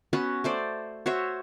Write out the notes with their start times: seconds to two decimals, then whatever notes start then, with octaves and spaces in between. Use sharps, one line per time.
0.13 B3 C#4 F#4 B4
0.44 A3 C5 D5
1.06 F#4 C5 C#5 E5